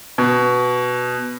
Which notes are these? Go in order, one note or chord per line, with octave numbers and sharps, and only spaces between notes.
B2